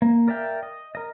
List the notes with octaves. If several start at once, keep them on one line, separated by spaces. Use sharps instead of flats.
A#3
A#4 D5 E5 F5 G5
D#5
A#4 D#5